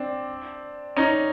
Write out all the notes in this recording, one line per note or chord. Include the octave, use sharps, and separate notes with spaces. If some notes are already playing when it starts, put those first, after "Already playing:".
Already playing: C4 D4
C#4 D#4